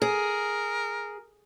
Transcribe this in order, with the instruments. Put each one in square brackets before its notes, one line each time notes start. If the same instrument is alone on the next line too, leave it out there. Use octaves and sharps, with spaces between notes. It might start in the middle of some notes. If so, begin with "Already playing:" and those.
[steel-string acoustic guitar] G#4 [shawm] A#4